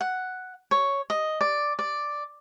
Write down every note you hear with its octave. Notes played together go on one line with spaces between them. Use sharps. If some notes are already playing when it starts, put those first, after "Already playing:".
F#5
C#5
D#5
D5
D5